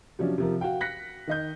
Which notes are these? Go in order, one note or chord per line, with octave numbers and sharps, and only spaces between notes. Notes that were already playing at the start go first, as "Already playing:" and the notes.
C3 F3 F#3 C#4 D4
C3 F3 A#4
F#4 F5 G5
F#6 A#6 B6 C#7
D#3 D#5 G6